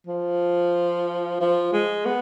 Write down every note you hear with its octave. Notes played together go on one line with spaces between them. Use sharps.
F3
F3
G#3
B3